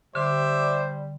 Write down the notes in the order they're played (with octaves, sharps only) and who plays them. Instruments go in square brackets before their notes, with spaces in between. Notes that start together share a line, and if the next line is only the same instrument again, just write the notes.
[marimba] D3 [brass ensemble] G3 [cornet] C5 [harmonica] E5 D6